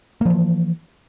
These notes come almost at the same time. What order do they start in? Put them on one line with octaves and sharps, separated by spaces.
A#3 F3 E3